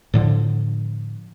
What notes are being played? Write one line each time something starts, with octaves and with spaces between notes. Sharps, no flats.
A2 D3 F3